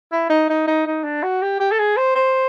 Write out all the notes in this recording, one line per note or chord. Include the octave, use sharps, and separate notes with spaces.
E4
D#4
D#4
D#4
D#4
D4
F#4
G4
G4
A4
G#4
C5
C5